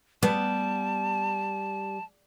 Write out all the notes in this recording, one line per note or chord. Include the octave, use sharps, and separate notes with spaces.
G3 B3 A5